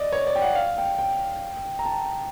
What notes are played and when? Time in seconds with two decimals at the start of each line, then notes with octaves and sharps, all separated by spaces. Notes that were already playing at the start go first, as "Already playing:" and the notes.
Already playing: D5 D#5
0.12 C#5
0.27 D5
0.35 G5
0.42 F#5
0.55 F5
0.78 G5
0.99 G5
1.79 A#5
1.85 A5